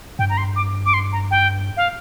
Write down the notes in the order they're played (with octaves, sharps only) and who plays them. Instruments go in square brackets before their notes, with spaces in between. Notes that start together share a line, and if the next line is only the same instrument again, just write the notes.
[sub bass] G2 [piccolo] G5
[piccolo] A#5
C6
D6
D6
C6
A#5
G5
F5